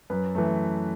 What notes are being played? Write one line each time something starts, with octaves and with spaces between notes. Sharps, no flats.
F#2 B4
E3 A3